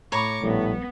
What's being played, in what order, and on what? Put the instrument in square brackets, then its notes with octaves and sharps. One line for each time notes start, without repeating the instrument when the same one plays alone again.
[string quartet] A2 C#6 D6 [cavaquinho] C#5 A#5 B5
[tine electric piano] A#1 G3 [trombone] A2 [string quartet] B3